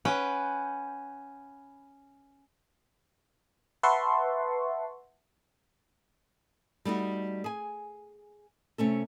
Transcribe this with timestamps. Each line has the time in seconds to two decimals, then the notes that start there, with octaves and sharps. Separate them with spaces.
0.05 C#4 B4 F#5 G5
3.83 B4 E5 F#5 A5 C6 C#6
6.85 G3 A3 D#4 F#4
7.44 G#4 G#5
8.78 C3 A3 C#4 A4